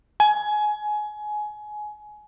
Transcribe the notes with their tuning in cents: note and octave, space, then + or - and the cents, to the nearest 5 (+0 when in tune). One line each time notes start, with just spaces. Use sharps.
G#5 +20